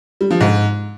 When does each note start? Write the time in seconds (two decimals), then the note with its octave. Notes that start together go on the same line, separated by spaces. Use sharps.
0.21 G3
0.31 F3
0.40 G#2